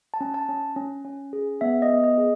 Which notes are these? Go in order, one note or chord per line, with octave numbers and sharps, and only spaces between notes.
A5
C#4
A5
C#4
C#4
C#4
G#4
B3 E5
D#5
B3
D#5
G#4